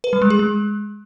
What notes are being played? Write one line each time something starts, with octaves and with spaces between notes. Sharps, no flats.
B4
G3
G#3
G#4
G#3